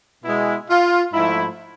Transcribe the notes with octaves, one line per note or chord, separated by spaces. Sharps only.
B2 G#3 E4
F4
G#2 F3 A3 E4